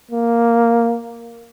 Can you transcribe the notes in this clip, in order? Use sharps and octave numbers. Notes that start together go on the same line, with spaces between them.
A#3